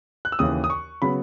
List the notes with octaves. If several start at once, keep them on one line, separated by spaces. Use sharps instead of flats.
F#6
E6
D#2 C#3 E3 D#6
D#6
C#6
C#3 F#3 B3 B5